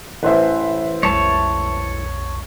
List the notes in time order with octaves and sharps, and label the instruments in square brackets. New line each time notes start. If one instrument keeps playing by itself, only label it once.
[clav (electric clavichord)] A1 [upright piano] B4 C5 E5
[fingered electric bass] B1 F2 G#3 [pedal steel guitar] C#5 A5